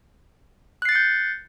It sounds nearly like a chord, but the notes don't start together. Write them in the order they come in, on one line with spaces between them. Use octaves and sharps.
F#6 C7 A6 C#7 G6